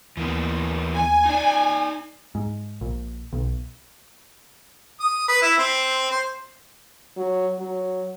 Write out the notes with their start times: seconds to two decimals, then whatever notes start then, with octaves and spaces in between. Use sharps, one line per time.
0.17 D#2 E3 A#3 B3
0.94 G#5
1.25 D#4 D5
2.35 G#2
2.81 A#1
3.33 B1
5.00 D#6
5.28 B4
5.42 E4
5.58 C4
6.11 C5
7.17 F#3
7.59 F#3